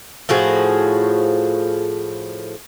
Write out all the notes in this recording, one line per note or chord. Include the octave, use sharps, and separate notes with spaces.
A2 F3 F#4 G#4